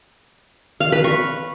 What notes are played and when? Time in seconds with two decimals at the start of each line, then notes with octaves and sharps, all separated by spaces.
0.80 F5
0.92 B4
1.04 C#6